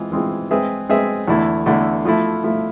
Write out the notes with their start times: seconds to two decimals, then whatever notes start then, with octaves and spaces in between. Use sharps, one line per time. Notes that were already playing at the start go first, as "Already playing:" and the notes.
Already playing: E3 G#3 C4 F4 G#4
0.12 E3 G#3 C4 F4 G#4
0.51 G#3 C4 G#4 B4 E5
0.89 G#3 C4 G#4 B4 E5
1.28 E2 D3 A3 E4
1.66 E2 D3 A3 E4
2.05 F3 A3 E4
2.44 F3 A3 E4